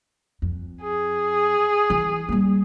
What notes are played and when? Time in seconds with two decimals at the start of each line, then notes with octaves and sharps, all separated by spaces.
0.42 F2
0.82 G#4
1.90 E3
2.29 G3 A#3